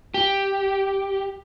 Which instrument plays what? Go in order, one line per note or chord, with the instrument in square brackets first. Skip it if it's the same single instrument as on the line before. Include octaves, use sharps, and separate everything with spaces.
[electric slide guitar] G4